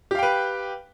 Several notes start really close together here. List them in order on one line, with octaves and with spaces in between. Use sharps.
G4 F5 G5 B4